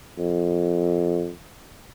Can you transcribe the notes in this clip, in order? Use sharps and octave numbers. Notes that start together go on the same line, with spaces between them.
F2